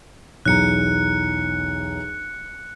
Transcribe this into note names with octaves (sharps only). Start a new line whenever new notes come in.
B1 E2 A#5 F#6 C#7